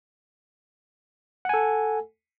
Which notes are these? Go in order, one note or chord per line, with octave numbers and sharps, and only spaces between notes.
A4 F#5 G#5